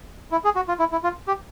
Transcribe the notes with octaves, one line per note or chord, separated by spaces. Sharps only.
E4
G#4
F#4
F4
E4
E4
F4
G4